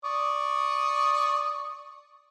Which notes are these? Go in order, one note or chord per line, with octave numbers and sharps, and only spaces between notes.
D5 C#6 D#6